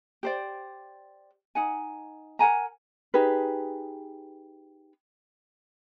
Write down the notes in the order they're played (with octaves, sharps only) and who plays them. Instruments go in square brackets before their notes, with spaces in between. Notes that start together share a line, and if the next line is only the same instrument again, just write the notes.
[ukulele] G4 C5 D5
D#4 F#5 G#5
A#4 F#5 G#5 A#5
D#4 G4 G#4 B4